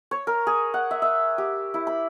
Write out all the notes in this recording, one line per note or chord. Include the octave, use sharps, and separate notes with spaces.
C#5
A#4
G#4
F#5
E5
E5
G4
E4
B5